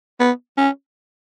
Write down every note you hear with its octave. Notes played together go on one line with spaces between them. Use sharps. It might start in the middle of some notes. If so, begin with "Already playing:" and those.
B3
C#4